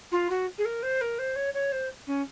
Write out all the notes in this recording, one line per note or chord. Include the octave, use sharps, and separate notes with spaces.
F4
F#4
G#4
A#4
C5
A#4
C5
C#5
C#5
C5
C#4